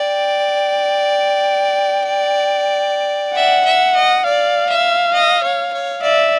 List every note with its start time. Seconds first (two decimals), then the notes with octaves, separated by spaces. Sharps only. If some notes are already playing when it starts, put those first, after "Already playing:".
Already playing: D5 G5
3.35 E5 F#5
3.65 E5
3.95 D#5
4.24 D5 F5
4.69 E5
5.13 D#5
5.43 C#5
5.73 C#5
6.02 D5 E5